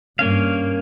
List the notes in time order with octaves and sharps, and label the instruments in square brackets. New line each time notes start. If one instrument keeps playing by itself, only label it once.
[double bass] G2 [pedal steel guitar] A#3 C#4 F5